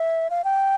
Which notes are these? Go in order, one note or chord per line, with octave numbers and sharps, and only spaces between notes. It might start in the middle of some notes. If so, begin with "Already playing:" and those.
Already playing: E5
F5
G5